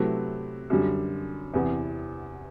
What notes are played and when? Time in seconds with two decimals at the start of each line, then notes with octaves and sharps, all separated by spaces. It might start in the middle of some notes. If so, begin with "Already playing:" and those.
Already playing: C3 F#3 A3 E4 B4
0.70 F#2 D3 G3
1.54 E2 C3 E3 B3